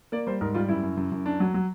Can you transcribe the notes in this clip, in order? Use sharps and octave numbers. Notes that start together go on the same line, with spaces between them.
A#3 D5
G3 C5
G#2 A#4
G3 F4
F#2 E4
F#2
F#2
F#2
D4
F#3
F#3